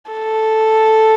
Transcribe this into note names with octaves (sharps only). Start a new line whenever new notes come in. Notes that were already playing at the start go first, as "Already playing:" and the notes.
A4